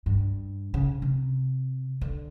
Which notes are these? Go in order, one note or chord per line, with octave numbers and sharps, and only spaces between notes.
G2
C#3
C3
D3